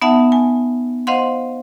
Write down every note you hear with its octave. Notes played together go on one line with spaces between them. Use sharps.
B3 D#4 E5 F#5 A5
G#5
C5 D#5 F5 F#5 C6